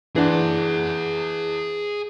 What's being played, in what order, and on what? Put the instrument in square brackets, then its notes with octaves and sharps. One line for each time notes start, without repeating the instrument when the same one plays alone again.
[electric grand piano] E3 D4 [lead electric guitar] G#4 F#5